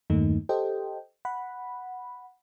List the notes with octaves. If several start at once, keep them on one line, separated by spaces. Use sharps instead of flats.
E2 G2 D#3 A3 A#3 D#4
G4 A4 C5 D#5 G5
F#5 B5